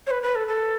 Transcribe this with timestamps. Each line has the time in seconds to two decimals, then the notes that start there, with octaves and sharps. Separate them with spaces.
0.07 C#5
0.11 B4
0.22 B4
0.35 A4
0.47 A4